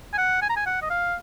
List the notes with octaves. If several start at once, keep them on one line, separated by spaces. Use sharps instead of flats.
G#5
F#5
G#5
A#5
G#5
F#5
D#5
F5